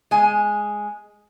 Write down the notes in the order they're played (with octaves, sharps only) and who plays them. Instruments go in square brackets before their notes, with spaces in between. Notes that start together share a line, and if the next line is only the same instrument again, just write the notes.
[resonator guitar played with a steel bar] G#3 G#5